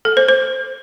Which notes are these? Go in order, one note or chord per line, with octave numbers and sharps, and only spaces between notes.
A4
C5
C5